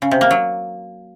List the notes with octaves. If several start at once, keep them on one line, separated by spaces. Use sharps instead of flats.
C#3
C3
A#3
F#3